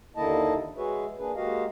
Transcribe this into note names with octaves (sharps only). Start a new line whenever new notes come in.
D#2 D3 A#3 E4 D#5 A5
G#3 F#4 G#4 B4 C#5 E5
A#3 D4 G#4 B4
G#3 A#3 F#4 G4 D#5 F5